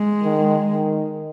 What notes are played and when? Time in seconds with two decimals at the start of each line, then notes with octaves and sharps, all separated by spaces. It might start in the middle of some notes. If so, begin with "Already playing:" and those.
Already playing: G#3
0.23 D#3
0.72 D#3